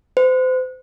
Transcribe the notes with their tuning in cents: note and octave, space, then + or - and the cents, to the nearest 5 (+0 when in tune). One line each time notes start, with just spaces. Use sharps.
C5 -35